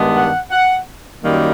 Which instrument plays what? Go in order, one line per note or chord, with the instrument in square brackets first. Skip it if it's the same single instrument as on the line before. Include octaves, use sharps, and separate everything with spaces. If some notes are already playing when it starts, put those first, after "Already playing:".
Already playing: [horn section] G2 D#3 G#3 B3 D4
F#5
F#5
F#2 D#3 G3 A#3